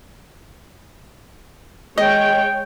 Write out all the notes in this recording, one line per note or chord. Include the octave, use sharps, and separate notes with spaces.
G#3 C#5 D#5 G5